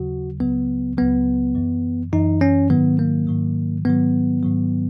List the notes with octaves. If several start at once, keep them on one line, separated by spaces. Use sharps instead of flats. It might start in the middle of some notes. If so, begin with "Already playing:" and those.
Already playing: D#2 C#3 F#3 F#4
C#2 C#3 F#3 B3
C#2 C#3 F#3 B3
F#2 E3
F#2 E3 D#4
C#4
G#2 D#3 F#3 B3
A#3
G#2 D#3 F#3
G#2 D#3 F#3 B3
G#2 D#3 F#3